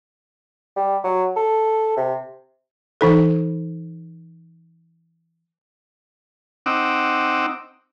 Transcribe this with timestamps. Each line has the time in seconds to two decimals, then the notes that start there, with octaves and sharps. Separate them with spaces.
0.76 G3
1.04 F#3
1.36 A4
1.97 C3
3.01 E3 D#4 A4
6.66 C4 D#4 F#5 D6 E6